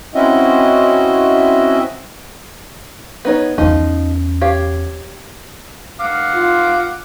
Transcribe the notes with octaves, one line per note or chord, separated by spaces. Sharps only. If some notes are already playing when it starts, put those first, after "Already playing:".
C4 C#4 E4 F#4 D#5 E5
B3 D#4 C#5
E2 F3 C#4 D#4
G4 C#5 F5
F5 F#5 D6
F4